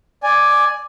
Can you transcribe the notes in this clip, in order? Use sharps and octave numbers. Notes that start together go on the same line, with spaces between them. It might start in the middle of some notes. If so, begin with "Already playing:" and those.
D5 G#5